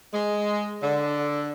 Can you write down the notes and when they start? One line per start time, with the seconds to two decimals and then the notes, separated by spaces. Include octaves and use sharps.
0.13 G#3
0.82 D3